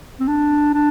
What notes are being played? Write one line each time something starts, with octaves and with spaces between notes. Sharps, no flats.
C4
D4
D4